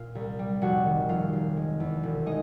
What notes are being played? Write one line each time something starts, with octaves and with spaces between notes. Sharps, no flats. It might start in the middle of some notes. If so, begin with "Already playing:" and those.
Already playing: A#2 F4 F5
C2
G3
F1 F#4 F#5
D#3
F1 F4 F5
F1
G#3
E2
E1
G#3 D#4 D#5